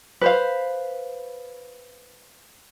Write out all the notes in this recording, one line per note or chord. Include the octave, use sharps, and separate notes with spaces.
B4 C5 F5